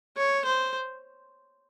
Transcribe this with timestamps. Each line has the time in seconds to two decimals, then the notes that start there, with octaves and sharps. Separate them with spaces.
0.17 C#5
0.45 C5